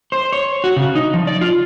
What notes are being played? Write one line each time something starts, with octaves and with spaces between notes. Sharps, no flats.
C5
C#5
F#4
C#3
D#4
F3
D5
F4